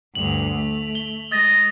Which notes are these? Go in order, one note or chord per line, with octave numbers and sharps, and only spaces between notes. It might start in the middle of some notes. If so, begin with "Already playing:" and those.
D2 G2 F7 F#7
A3
G7
G#3 D#5 A6